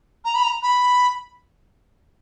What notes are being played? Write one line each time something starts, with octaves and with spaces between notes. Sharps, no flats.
A#5
B5
A#5
B5